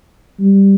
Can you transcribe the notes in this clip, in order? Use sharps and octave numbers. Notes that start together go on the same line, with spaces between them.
G3